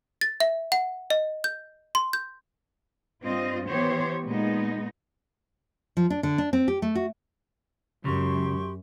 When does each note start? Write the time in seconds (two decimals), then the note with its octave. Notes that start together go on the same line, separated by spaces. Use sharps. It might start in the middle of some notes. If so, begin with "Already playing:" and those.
0.21 A6
0.40 E5
0.72 F#5
1.10 D#5
1.44 G6
1.95 C6
2.13 G6
3.22 G2 C4 F4 D#5
3.67 E3 B3 G4 C5 C#5
4.26 A#2 G#3 B3 D#4
5.97 F3
6.10 D4
6.23 D3
6.38 D4
6.53 C4
6.68 G4
6.82 A3
6.95 F#4
8.04 C#2 F#2 C#3 G4 C6 C#6